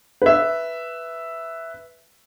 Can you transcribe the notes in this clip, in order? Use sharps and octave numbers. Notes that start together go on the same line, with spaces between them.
B4 E5